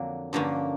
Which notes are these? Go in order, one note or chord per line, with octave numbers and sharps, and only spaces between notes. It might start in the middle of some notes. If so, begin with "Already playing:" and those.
Already playing: F2 D3 F#3 A#3
G2 D3 F3 A#3 C#4